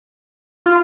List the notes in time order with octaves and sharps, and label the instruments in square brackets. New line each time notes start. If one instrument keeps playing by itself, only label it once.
[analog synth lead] F4